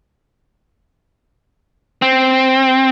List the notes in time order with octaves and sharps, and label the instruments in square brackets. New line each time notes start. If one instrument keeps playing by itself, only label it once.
[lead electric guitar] C4